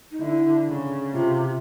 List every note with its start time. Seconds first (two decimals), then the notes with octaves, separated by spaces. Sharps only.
0.11 D#4
0.21 D3 E4
0.68 C#3
1.14 C3 F4